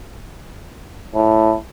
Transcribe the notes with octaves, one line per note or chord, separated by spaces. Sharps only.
A2